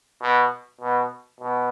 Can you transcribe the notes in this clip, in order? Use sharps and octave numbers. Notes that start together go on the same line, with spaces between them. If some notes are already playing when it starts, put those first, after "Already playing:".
B2
B2
B2